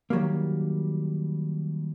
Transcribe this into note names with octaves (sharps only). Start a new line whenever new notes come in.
D#3 F#3 G3 A#3